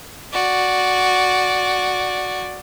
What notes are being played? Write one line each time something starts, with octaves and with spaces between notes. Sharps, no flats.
F#4 D5